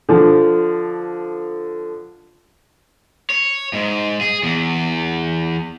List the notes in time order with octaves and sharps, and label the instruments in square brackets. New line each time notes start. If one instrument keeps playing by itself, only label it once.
[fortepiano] D3 F3
[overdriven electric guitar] C#5
G#2
G#4
E2